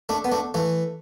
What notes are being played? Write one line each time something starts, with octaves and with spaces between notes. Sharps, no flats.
A3 D4
B3
A3 D4
E3 A3